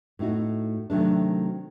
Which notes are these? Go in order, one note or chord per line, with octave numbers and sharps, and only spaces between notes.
A2 A3 D#4 F#4
C3 D#3 F#3 A3 D4